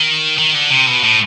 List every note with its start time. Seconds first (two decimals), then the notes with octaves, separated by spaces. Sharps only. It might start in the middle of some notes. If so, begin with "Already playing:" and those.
Already playing: D#3
0.38 D#3
0.55 D3
0.71 C3
0.87 B2
1.04 A2